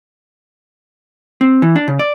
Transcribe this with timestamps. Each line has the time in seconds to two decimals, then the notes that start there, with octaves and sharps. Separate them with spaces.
1.41 C4
1.62 E3
1.76 D4
1.88 C#3
1.99 D5